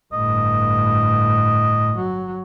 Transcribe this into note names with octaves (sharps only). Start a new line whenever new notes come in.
G1 A2 D#5
F#3